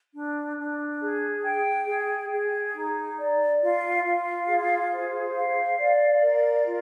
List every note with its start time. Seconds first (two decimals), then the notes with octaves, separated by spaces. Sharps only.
0.14 D4
0.57 D4
1.00 G#4
1.44 G5
1.87 G#4
2.31 G#4
2.74 D#4
3.18 D5
3.61 F4
4.04 F4
4.49 G#4
4.92 C5
5.35 F5
5.79 D5
6.22 A#4
6.65 F4